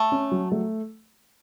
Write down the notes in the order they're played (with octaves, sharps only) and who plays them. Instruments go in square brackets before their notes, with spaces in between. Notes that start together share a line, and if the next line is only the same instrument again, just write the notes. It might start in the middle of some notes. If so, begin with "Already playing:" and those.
Already playing: [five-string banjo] A3
[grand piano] C#4
F#3
A3